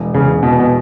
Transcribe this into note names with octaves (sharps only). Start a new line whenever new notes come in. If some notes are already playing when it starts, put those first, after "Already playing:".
Already playing: E1
E2 C#3
E2 B2
B2